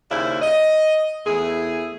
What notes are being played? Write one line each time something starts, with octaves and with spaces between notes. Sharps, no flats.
D#2 C#3 C#4 E4 C5 D5
D#5
E2 A3 E4 G#4